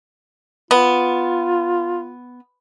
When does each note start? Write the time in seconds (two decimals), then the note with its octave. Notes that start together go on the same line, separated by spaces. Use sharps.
0.71 B3 F4